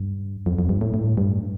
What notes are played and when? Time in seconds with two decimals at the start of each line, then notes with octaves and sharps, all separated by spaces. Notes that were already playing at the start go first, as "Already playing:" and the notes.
Already playing: G2
0.46 F2
0.59 F2
0.69 G2
0.81 A2
0.94 A2
1.17 G2